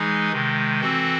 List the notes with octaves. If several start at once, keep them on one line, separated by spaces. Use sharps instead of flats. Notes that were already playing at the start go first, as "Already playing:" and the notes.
Already playing: E3 G#3 D#4 G#4
C3 D#3 G#3
E3 C4 F#4 A4